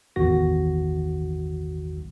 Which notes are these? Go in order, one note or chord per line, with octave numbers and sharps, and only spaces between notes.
A1 E2 D#3 F#4 A#6